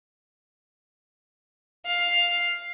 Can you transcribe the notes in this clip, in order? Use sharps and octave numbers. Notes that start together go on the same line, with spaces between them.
F5